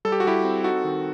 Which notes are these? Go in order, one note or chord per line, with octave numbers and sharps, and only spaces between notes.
G3 A4
G4
F#4
G3 E4 G4
C4
D#4 F#4 A4
D#3